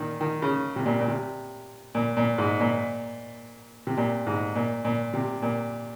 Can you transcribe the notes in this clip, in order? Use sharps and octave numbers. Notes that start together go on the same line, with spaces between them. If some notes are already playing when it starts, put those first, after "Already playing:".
Already playing: A#2 D#3
D#3
C#3
C3
A#2
A#2
C3
A#2
A#2
G#2
A#2
C3
A#2
G#2
A#2
A#2
C3
A#2